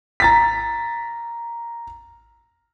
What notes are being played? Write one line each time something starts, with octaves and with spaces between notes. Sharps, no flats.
A#5 A6 B6